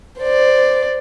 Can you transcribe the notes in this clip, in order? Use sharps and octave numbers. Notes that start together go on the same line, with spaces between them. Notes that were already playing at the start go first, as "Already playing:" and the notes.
C5 D5